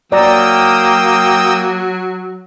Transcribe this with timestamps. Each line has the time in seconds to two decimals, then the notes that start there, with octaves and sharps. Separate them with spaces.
0.12 F#3 A#3 D5 G5 A#5 D#6 E6